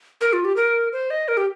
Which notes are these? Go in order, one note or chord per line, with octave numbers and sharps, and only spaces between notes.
A#4
F4
G4
A#4
C5
D#5
A#4
G4